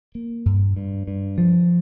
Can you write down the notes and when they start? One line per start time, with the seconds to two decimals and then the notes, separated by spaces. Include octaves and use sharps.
0.15 A#3
0.46 G2
0.76 G2
1.07 G2
1.38 F3